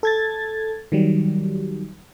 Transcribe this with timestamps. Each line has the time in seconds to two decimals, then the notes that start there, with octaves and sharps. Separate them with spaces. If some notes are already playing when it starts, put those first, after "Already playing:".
0.03 A4 G#6 A6
0.92 D#3 F#3 G3